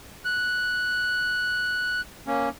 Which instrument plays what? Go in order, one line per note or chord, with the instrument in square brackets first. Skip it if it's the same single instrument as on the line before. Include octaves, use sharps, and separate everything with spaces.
[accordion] F#6
A#3 C#4